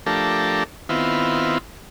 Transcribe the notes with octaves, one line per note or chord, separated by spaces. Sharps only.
F3 A3 D4 G4 A4 A#4
D#3 B3 C4 E4 F4